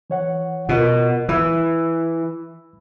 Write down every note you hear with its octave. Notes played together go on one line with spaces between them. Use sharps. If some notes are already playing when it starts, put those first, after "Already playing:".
E3 C#5 F#5
B2 F4 A#4
E3 B5 E6